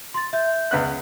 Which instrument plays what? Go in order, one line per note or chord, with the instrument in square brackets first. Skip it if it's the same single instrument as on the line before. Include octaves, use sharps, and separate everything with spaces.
[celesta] C6 A6
E5 G6
[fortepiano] C#2 B3 F#6